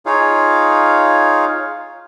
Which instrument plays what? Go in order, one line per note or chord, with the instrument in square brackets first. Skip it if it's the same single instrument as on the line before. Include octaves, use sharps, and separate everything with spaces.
[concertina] D#4 F4 G#4 C#5 F5